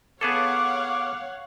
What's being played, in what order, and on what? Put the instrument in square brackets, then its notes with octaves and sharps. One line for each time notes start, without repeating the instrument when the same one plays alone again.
[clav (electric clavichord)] B3 G#4 A4 [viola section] C#5 F5 F#5 [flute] D6